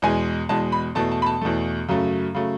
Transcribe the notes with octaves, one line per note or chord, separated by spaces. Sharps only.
E2 B2 G#3 G#5
E2 B2 G#3 A5
B5
E2 B2 A3 A5
A5
B5
A5
E2 B2 A3
F#2 C#3 F#3 A3
C#3 F#3 A3